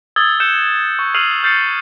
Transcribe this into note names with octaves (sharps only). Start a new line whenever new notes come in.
D#6 E6 G#6 A6 G7
F#6 G6 C#7 E7
C#6
E6 F6 C7 D#7 F7 F#7
F6 G6 A6 C7 C#7